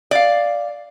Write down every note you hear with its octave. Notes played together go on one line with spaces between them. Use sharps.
D5 F5